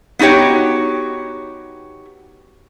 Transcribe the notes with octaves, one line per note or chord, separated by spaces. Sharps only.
B3 D#4 F#4 G4 C#5